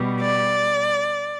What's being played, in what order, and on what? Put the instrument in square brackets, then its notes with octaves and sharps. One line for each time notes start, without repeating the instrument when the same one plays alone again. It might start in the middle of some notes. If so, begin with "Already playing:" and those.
Already playing: [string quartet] B2 G3
D5